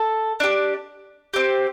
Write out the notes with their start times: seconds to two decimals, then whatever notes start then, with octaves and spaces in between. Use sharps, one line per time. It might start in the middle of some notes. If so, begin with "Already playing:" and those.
Already playing: A4
0.40 D4 G4
1.34 C4 G4